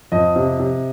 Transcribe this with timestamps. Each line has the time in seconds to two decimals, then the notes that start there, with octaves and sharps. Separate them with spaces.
0.12 F2 D#5
0.36 C3
0.59 C3